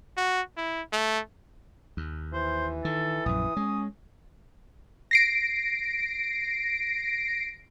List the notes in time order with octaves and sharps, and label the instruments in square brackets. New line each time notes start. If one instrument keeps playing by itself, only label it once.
[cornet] F#4
E4
A3
[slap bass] D#2
[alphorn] E3 [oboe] C5
[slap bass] D#3 [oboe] A4
[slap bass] A#1 F#2 [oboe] D#6
[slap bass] G#3 [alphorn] C#4
[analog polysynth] A#6 C7 D7